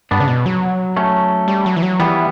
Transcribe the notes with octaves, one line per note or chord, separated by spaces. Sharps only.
G2 B3 D4
C#3
B2
F#3
A3 C#4
G3
F#3
E3
F#3
E3 G3 B3